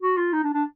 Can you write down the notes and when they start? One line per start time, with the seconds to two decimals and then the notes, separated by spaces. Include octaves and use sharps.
0.01 F#4
0.17 F4
0.33 D#4
0.44 D4
0.54 D4